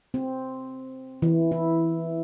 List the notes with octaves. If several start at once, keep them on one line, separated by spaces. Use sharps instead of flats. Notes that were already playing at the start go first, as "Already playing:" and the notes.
C4
E3
E4